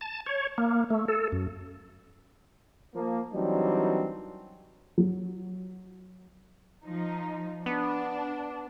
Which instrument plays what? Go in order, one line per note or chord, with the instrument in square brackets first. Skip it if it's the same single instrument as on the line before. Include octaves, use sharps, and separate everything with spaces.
[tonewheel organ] A5
C#5
A#3
A3
A4
F#2
[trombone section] F3 A#3
E3 F#3 G3 C4 D4 D#4
[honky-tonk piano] F#3
[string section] F3 D#4
[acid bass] B3 [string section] D4